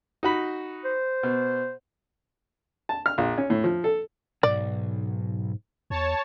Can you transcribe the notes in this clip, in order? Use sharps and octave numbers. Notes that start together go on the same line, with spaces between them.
D#4 F#4 B5
C5
B2
A5
F6
A#1
C#4
A2
F3
A4
B1 G#2 D5
E2 C#5 A5